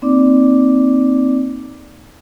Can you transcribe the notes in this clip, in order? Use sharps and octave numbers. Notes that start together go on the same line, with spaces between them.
A#3 C4 D#4 D5 D6